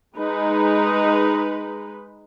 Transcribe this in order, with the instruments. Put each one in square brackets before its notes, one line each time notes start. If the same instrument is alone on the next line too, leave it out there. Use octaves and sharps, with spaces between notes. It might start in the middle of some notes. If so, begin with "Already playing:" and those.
[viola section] G#3 D#4 B4